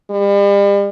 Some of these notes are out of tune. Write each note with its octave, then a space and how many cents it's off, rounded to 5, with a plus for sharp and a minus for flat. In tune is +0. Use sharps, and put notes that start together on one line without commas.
G3 +40